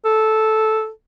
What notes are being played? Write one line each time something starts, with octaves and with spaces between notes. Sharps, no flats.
A4